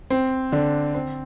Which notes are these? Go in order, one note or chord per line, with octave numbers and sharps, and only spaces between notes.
C4
D3 D4
C4